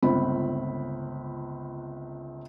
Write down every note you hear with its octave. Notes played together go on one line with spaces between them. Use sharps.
G1 C#2 C4 B5